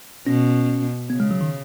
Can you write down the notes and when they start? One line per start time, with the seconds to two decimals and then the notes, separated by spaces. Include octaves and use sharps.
0.27 B2 C#4
1.10 C#3 B3
1.20 G#3
1.31 F#3
1.41 D#3